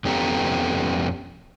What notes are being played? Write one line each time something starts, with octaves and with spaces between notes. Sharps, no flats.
F2 B3 C#4 G4 A4 A#5